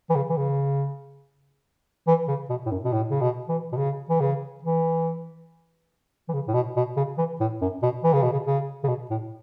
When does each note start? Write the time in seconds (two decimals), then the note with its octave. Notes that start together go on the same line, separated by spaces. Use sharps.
0.10 E3
0.15 C#3
0.29 E3
0.37 C#3
2.07 E3
2.28 C#3
2.49 B2
2.66 A2
2.71 F#2
2.84 B2
2.93 A2
3.10 C#3
3.21 B2
3.48 E3
3.72 B2
3.77 C#3
4.09 E3
4.20 C#3
4.63 E3
6.28 E3
6.34 C#3
6.47 A2
6.54 B2
6.76 B2
6.96 C#3
7.18 E3
7.40 A2
7.61 F#2
7.83 B2
8.04 E3
8.13 C#3
8.22 B2
8.33 C#3
8.46 C#3
8.84 C#3
8.88 B2
9.10 A2